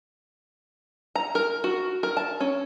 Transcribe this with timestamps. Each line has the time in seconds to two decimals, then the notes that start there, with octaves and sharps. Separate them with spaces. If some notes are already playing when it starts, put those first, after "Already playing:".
1.15 A#5
1.35 A#4
1.64 F#4
2.03 A#4
2.17 A5
2.41 C#4